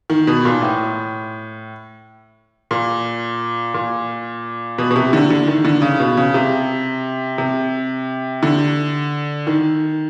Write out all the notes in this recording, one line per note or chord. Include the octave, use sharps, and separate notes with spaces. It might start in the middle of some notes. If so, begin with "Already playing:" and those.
D#3
B2
A#2
A2
A#2
A#2
B2
B2
C3
D3
D3
D#3
D3
C#3
B2
C#3
C3
C3
D3
D#3